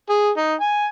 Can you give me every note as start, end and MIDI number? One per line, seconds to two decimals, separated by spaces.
0.10 0.30 68
0.37 0.54 63
0.61 0.86 80